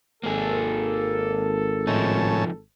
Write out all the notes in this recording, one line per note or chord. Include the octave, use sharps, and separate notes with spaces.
G#1 A#3 G#4 A4
A2 F3 C#4 D#4 A5